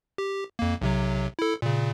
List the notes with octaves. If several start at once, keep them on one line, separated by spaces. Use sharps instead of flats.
G4
F2 A#3
B1 C3 F#3
E4 A4
A#2 C#3